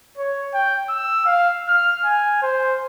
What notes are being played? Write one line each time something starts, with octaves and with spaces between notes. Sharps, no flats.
C#5
G5
E6
F5
F6
G#5
C5